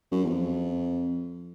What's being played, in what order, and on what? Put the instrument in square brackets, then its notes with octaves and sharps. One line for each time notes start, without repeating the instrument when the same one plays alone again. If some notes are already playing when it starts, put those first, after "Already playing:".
[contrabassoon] F#2
E2
F2